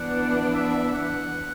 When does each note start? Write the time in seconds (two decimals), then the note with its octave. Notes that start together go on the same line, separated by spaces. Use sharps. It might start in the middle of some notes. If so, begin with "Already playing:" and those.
Already playing: E3 B3 D4 F#5
0.54 E5
0.93 F#5